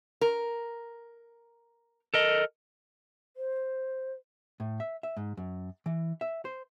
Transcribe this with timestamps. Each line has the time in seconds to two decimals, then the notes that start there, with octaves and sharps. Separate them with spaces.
0.21 A#4
2.14 A4 A#4 D#5
3.37 C5
4.60 A2
4.80 E5
5.03 E5
5.17 G#2
5.37 F#2
5.86 E3
6.21 E5
6.45 C5